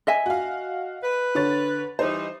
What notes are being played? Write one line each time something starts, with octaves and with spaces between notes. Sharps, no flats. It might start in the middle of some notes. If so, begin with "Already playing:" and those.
D#5 E5 G#5
F#4 F5
B4
D3 C#5 A6
E3 G3 D#4 C5